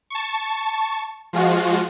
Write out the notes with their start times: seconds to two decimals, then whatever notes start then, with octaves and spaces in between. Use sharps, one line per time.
0.10 A5 C#6
1.33 F3 G#3 F4 F#4